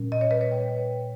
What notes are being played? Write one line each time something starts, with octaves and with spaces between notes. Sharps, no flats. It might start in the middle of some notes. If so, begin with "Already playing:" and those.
Already playing: A#2 G3 C#4
D#5
C#5
B4
C#5
G5